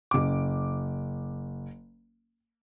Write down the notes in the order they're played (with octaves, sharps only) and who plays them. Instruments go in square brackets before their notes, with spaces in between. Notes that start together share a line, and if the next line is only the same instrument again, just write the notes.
[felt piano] F#1 D6